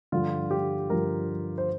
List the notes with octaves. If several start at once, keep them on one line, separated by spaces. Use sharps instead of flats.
G2 D3 F3 F4
G4
G2 D3 F3 A#4
C5